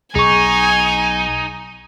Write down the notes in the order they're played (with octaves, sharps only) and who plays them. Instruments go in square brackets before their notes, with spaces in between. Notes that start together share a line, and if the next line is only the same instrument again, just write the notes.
[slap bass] B1 [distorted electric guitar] D#4 [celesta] G#4 C#6 [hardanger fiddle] G#5